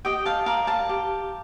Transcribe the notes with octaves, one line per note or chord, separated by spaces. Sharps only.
G4 D#5 G5
F5 A5
A#4 D5 F5
F5 A5
G4